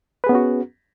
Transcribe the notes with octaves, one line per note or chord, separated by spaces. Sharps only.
B3 C#4 F#4 G#4 B4